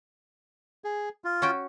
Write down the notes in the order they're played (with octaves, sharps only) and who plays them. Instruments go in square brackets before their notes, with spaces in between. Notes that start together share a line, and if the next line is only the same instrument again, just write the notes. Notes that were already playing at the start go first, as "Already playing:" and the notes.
[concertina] G#4
F4
[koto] C#4 F#4 G5